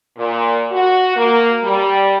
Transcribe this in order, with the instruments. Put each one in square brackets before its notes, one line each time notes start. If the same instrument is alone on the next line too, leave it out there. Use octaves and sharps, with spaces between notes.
[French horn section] A#2
F#4
A#3
G3